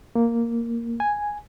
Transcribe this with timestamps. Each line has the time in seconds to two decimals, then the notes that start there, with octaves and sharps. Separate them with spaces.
0.16 A#3
1.00 G#5